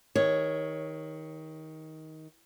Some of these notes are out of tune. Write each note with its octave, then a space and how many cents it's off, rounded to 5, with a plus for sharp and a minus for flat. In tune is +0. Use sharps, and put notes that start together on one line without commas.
D#3 +20 G#4 -45 C#5 +0